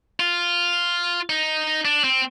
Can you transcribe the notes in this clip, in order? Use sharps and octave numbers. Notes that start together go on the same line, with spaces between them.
F4
D#4
D4
C4